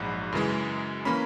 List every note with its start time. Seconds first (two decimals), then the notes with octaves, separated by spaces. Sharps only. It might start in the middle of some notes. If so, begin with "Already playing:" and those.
Already playing: A#1 G#2 F#3 B5
0.33 F#2 C#3 E3 G#3
1.05 E3 A#3 C#4 B5